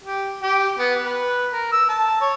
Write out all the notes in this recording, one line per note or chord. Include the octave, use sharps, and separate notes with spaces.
G4
G4
B3
B4
A#4
E6
A5
C#5